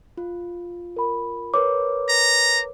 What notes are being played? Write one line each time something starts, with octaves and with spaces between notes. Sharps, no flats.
F4
A#4 B5
A#4 B4 C#5 D6
A#5